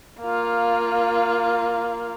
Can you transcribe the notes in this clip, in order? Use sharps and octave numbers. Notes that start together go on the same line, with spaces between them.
A#3 F4